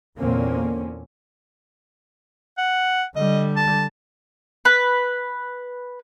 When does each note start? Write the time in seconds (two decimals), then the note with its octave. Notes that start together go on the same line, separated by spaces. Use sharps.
0.18 E2 A#2 D3 A#3 C4 C#4
2.58 F#5
3.16 D3 G3 D#5
3.57 A5
4.65 B4